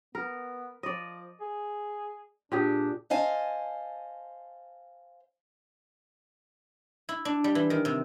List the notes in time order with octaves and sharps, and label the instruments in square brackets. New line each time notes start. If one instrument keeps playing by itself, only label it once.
[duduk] B3 [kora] A#4
[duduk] F3 [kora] D5 D#5
[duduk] G#4
[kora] A#2 G4 G#4 [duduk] D4
[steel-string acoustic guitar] C5 D#5 F5 G#5 A5
[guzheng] E4
D4
G3
E3
D#3
C3